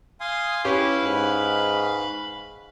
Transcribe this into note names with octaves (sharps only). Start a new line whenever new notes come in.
F5 G#5 C6 D#6
C#4 E4 G4 B4 F5
G#2 B5